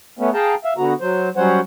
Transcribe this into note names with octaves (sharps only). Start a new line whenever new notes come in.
A3 B3 C#4
G#4 F5 G5 A5 A#5
E5 F5
D3 B3 F#4 A#5
F#3 C5
F#3 G3 C#4 C5 C#5 F#5